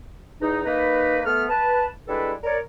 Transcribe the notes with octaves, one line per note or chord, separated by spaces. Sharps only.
E2 D#4
A#3 D#4 B4
A3 B3 F6
B4 A5
G3 G#3 D4 E4 A4 B4
A#4 C#5 D5